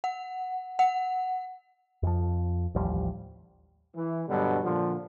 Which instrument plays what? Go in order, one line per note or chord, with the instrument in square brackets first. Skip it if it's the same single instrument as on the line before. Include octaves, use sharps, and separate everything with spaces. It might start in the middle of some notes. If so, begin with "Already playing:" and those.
[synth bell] F#5
F#5
[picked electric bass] F2 F3
A1 D#2 F3 G3
[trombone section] E3
G2 B2 D3 F#3 G3
A#2 D3 F3